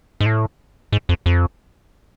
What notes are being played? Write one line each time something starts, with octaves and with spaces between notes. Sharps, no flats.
G#2
A2
G#2
F2
F2